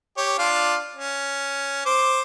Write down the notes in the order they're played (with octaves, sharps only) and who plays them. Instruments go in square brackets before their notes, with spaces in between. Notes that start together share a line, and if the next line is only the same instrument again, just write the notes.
[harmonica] G4 C#5
D4 F4 F5
C#4
C5 D6